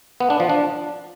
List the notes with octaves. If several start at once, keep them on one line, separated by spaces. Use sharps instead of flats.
B3
D4
F3
D4